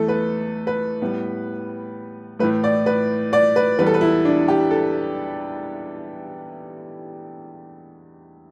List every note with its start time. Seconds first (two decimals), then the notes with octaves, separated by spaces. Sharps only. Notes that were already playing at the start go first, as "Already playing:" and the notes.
Already playing: E2 E3 A3 A4
0.08 B4
0.67 B4
1.01 A2 G3 B3
2.39 A2 E3 A3 B4
2.64 D5
2.86 B4
3.33 D5
3.56 B4
3.78 E2 E3 G3 B3 B4
3.86 A4
3.94 B4
4.01 E4
4.25 D4
4.48 G4
4.71 A4